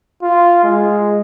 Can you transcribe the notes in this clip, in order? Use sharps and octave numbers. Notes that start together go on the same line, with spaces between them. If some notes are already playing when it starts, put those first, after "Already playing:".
F4
G#3